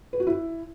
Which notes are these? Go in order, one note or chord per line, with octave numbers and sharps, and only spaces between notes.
B4
F#4
E4